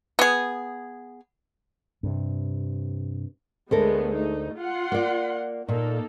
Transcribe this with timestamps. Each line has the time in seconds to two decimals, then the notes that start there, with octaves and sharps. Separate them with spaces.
0.19 B3 G#4
2.03 G2 C3
3.71 D2 G#3 A3 B3 A4 A#4
4.14 A3 D#4
4.56 F4 F#5 C6
4.92 A#3 D5
5.68 A#2 A#3 D#4 A4